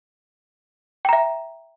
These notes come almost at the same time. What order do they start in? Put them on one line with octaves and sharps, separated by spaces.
G5 A#5 E5